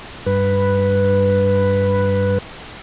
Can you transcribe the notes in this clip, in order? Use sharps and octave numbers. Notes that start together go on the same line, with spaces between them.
G2 B4